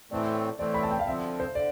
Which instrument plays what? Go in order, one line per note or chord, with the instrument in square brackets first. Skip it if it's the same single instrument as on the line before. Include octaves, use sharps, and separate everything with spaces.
[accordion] A2 E3 A3 C4 [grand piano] D5
[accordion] A2 E3 A3 C4 [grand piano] D5
[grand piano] B5
A5
G5
F5
[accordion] D3 F3 C4 [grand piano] E5
[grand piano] C5
[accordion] D3 [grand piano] D5